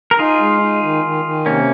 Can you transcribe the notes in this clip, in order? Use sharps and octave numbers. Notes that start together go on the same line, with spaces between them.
A#4
D#4 F4 G#4
G#3
D#4
D#3
D#3
D#3
C3 A#3 C#4